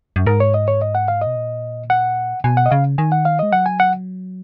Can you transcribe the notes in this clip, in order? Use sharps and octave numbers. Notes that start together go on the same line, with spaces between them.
F#2
G#2 A#4
C#5
D#5
C#5
D#5
F#5
F5
B2 D#5
A#2
F#5
B2 G#5
F#5
D#5
C#3 F5
D#3 G#5
F#5
F5
G#3 D#5
F#3 F#5
G#5
F#5